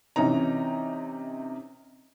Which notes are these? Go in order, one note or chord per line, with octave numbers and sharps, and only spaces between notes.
C3 E3 C#4 D#4 A#5